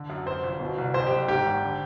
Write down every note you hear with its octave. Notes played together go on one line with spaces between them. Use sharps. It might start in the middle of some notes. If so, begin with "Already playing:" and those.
Already playing: D3
F#2
F#2 C5
G1
B2
C2
F2 C5
F#1 G4
G#2 G4
G#1
D3